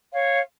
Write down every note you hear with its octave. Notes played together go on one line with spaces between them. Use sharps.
C#5 F5